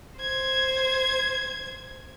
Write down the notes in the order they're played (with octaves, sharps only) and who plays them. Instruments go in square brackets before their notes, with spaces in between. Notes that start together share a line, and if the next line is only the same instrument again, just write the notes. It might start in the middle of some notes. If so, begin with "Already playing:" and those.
[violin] C5 G#6